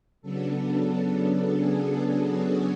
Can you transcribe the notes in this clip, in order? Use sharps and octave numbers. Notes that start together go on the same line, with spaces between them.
C#3 F#3 B3 D4 A4
G#4
F#4